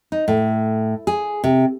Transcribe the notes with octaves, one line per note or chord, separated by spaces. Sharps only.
D#4
A2
G#4
C3